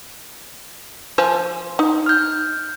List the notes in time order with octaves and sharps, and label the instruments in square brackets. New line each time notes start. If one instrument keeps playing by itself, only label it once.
[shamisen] F3 C5 G#5
D#4
[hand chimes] F6 G6